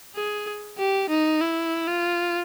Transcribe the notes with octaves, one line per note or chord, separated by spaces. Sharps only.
G#4
G4
D#4
E4
F4